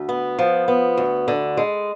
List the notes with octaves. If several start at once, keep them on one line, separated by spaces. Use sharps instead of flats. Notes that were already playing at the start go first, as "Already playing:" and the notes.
Already playing: D2
B3
F3
B3
D2
D3
G#3